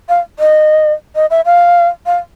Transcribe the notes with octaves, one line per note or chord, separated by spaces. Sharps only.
F5
D#5
D#5
E5
F5
F5